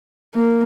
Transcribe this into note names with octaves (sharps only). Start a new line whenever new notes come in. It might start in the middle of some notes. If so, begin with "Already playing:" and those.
A#3